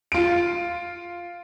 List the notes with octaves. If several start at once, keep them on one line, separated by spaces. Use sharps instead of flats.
F4 D7